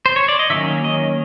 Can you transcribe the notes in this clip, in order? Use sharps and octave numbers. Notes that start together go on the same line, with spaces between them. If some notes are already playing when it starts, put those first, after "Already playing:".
C5
C#5
D5
D#5
D#3 F#3 A#3 C#4 E5
D#5